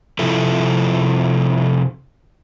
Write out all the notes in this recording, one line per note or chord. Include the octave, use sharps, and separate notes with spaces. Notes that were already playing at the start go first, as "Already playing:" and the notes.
C3 F3 E4 A4